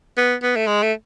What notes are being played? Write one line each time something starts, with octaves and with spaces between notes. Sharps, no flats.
B3
B3
A3
G#3
A3